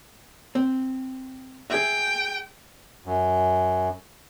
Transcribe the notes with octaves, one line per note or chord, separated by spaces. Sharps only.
C4
G#4 E5 G5
F#2